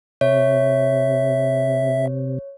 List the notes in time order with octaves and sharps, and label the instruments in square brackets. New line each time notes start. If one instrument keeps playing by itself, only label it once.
[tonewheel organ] C3 [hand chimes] C#5 [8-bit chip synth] E5